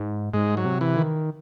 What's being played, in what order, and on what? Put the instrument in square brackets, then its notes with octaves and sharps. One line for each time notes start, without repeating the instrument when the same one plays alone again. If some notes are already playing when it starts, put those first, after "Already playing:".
Already playing: [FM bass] G#2
[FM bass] G#2 [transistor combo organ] G#3
[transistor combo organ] F#3
[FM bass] C3
[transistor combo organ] E3
[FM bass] D#3